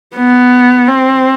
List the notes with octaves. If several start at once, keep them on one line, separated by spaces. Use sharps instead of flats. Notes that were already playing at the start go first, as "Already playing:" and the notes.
B3
C4